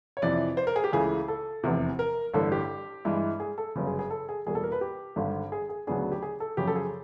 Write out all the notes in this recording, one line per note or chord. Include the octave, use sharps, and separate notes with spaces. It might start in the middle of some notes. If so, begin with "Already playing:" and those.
C#5
F2 C3 E3 D5
C5
A#4
G#4
G4
C#2 C#3 E3 A3 G#4
A4
F1 E2 C3
A#4
A1 G2 D3 A4
G4
G2 E3 G#3
G#4
A4
G1 F#2 C#3
G#4
G#4
A4
G#4
E2 B2 G3 A#3 G#4
A4
A#4
B4
G4
G#1 G2 D3
G#4
G#4
D2 C#3 F#3 B3 D4 G#4
G4
G#4
A4
F#2 C#3 F3 G4
A4
G#4